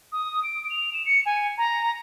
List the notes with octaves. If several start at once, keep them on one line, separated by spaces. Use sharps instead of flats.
D#6
D7
F7
E7
C#7
G#5
A#5